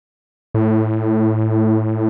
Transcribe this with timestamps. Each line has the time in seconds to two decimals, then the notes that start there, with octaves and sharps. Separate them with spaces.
0.54 A2